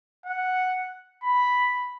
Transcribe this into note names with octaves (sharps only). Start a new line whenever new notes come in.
F#5
B5